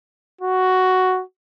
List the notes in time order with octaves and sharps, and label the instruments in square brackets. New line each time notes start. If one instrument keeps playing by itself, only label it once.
[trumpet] F#4